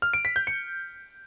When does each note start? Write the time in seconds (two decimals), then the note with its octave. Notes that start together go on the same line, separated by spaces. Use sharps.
0.02 F6
0.13 D7
0.25 B6
0.36 G6
0.47 C#7